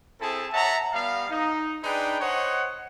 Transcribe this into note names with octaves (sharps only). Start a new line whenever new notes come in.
C4 E4 G#4 A4 A5
C#5 E5 F#5 A5 A#5
G3 B3 F5
D#4
D4 D#4 G#4 B4 G5
C5 C#5 D#5 F#5